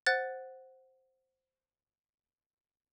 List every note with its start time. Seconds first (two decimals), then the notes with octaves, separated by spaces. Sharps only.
0.07 C5 F#5 F#6 A6